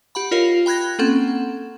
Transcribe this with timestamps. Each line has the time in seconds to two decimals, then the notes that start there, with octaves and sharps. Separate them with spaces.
0.15 G4 F#5 B5
0.31 F4 A#4 C#5 D#5 F5
0.66 G5 B5 F#6 G#6 A#6
0.99 A#3 C4 C#4 A4 F#5